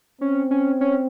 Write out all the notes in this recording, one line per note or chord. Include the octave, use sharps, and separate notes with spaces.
C4 C#4
C#4
C#4